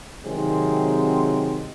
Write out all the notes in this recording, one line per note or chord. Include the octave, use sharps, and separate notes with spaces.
C3 D#3 F#3 G#3 C4